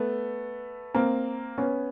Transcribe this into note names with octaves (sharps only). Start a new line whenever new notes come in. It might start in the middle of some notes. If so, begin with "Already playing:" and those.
Already playing: A3 B3
A#3 C4
B3 C#4